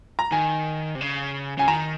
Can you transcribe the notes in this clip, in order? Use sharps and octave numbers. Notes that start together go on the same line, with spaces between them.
A#5
D#3 G#5
C3
C#3
C#3 G#5
D#3 A#5